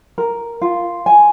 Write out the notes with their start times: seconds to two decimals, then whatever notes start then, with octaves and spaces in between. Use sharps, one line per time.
0.18 A#4
0.62 F4
1.06 G#5